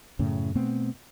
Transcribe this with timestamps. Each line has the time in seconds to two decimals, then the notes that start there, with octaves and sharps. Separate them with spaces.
0.19 F#2 A2 C#3
0.55 B2 A3 B3 C4